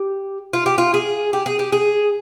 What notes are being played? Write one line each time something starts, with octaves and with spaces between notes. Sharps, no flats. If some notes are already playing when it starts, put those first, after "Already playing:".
Already playing: G4
F4
G4
F4
G#4
G4
G#4
G4
G#4